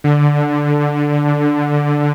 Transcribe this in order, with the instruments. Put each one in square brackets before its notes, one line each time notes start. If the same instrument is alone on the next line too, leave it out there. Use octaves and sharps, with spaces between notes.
[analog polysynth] D3